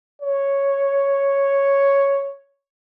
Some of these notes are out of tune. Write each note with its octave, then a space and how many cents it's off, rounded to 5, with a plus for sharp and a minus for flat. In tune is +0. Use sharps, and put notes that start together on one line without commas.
C#5 +0